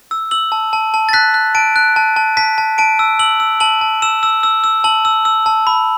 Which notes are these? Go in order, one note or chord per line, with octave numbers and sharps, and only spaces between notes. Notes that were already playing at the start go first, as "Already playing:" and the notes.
E6
E6 F#7
A5
A5
A5
A6
F#6 B6
F#6
A5 D7
F#6
A5
A5
A5 B6
A5
A5 D7
E6
E6 F#7
E6
A5 F#7
A5
E6 E7
E6
E6
E6
A5 F#7
E6
E6
A5
B5